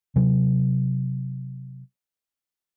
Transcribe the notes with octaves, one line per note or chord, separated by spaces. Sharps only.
C3 F#3